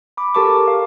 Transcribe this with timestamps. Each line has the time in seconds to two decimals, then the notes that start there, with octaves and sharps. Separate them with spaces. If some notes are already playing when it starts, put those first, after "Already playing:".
0.17 B5 D6
0.34 G4 A4 A#4 A5 C#6 D6
0.68 F5